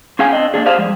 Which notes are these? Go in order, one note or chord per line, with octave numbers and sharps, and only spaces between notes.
C#4 G#4 F5 G5 G#5
C4 D4 D#5
A#3 B3 D4 G#4
G4 G#4 C5 D5 F5 A5
F2 G3 G#3